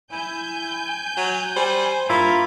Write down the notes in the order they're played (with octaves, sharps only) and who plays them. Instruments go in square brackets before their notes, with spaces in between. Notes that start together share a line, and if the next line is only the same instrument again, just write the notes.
[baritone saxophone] E4 [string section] G#5 G6
[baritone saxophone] F#3
[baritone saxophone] G3 [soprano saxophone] C5
[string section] G2 [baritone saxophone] A#3 [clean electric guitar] E4 [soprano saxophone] F4